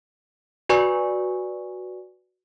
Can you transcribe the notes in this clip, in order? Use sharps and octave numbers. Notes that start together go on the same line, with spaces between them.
F#4 B4 D5 G#5 C#6